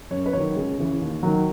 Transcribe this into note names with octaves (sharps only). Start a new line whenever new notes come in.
F#2 C#5
B4
D#3 F#3 C#5
C#2
C#3 E3
D#2
D#3 F#3